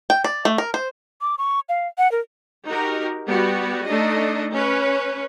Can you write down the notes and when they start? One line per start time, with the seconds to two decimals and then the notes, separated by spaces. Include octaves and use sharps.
0.10 G5
0.24 D5
0.45 A3
0.58 A#4
0.74 C5
1.21 D6
1.38 C#6
1.69 F5
1.98 F#5
2.12 A#4
2.67 D#4 F#4 G4 A#4
3.27 G3 B3 F#4 G4
3.85 A3 D4 D#4 D#5
4.54 C#4 B4 C#5